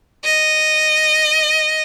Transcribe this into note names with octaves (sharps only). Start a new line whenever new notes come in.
D#5